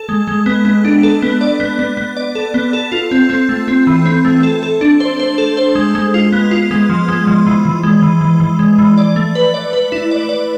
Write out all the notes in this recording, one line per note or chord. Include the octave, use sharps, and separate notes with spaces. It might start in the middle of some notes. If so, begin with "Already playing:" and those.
Already playing: A4
G#3
G#3
B3
B3
D4
A4
B3
D5
B3
B3
B3
D5
A4
B3
A4
F4
C4
C4
A3
C4
E3
C4
A3
A4
A4
D4
C5
C5
A4
C5
G#3
G#3
F4
B3
F4
G#3
F3
G#3
F3
E3
E3
G#3
E3
E3
E3
G#3
E3
D5
A3
B4
D5
B4
E4
D5
D5